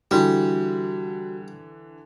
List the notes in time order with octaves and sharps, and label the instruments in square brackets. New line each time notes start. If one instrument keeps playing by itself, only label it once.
[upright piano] D3 E3 [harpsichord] G3 [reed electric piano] F#4 A4